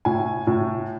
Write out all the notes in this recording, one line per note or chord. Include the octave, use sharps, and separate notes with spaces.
A2 G#5
A2